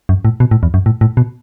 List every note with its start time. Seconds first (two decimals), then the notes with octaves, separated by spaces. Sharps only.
0.09 F#2
0.25 A2
0.40 B2
0.51 A2
0.63 E2
0.74 F#2
0.86 A2
1.01 A2
1.17 B2